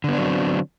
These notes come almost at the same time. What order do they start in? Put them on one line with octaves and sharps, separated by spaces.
D3 B3 D4 F#3 C4